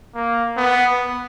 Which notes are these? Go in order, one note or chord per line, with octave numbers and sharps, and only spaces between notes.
A#3
B3